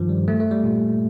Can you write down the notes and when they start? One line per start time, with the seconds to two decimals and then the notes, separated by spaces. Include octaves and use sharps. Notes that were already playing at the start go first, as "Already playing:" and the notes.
Already playing: G2 D#3 F3
0.09 G3
0.28 A3
0.40 A3
0.51 G3
0.64 A#2